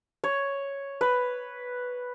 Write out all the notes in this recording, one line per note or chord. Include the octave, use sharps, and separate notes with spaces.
C#5
B4